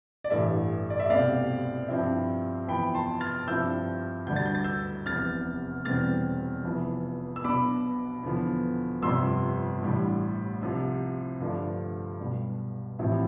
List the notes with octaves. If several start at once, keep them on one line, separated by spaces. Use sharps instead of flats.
D5
A1 G2 E3 A3 E5
D5
E5
C2 B2 A3 C4 D5 F5
G2 F3 C4 E4
F2 E3 B3 G5 B5
A5 C6
F6 A6
G2 F3 C4 E4 E6 G6
D2 D3 G3 D4 G6
A6
G6
A6
E6 G6
F1 E2 C3 F6 A6
E1 E2 B2 G3 C4 F6 A6
F1 F2 E3 B3
E6
B1 B2 B3 D4 B5 D6
E2 D3 F3 B3
G1 F2 C3 G3 C6 E6
A1 A2 G3 D4
C2 C3 F3
G2 D3 F3 A3 D4
B1 B2 G3
A1 A2 F3 C4 E4